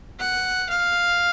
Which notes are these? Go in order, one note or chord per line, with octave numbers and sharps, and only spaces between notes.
F#5
F5